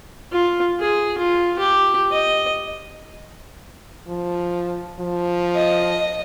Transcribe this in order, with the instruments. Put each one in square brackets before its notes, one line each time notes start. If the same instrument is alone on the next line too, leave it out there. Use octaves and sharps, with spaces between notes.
[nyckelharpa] F4
G#4
F4
G4
D#5
[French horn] F3
F3
[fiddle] D#5